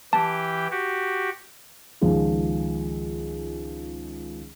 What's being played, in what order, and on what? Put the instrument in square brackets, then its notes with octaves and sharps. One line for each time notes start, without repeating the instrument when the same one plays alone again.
[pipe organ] E3 G4 G5 [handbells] A5
[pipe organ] F#4 G4
[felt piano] C#2 D#3 F3 G#4